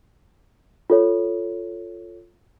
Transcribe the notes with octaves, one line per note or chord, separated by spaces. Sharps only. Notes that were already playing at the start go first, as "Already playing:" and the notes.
F4 A4 C#5